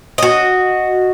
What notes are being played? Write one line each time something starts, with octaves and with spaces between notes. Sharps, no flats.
F#4 D#5